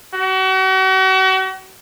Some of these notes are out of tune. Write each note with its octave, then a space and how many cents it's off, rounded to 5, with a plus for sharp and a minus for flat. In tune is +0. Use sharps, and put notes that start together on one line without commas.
F#4 +40